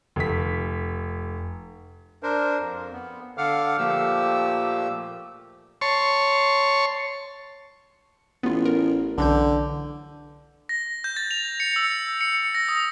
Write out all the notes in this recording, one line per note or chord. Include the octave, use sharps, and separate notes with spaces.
F1 B6
D4 A#4 C5
F2
B3
D3 A4 F5 F#5 D6 F6
A#2 F3 A3 A#3 G4 E6
C#5 A5 C6 C#6
A1 B3 F4
A#4
B1 D3 E3 G6
A#6
G6
A6
F7
C#7
E6
C#7
C#7
A#6
D#6